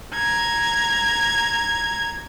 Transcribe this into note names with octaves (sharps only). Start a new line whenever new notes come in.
A#5 G#6